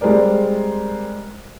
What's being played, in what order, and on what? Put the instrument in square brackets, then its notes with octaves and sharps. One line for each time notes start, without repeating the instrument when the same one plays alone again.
[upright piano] G3 G#3 C4 A#4 D5